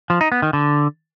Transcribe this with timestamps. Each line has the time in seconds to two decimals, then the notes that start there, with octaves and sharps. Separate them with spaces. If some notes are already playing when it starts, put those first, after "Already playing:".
0.10 F3
0.21 D#4
0.32 B3
0.42 D#3
0.53 D3